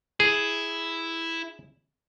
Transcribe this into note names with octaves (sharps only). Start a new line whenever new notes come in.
E4 G#4